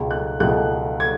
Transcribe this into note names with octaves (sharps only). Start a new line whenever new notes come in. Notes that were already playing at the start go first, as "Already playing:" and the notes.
Already playing: C#2 B2
F#6
C#2 B2 F#6
G#6